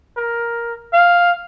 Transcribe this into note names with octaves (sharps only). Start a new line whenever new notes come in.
A#4
F5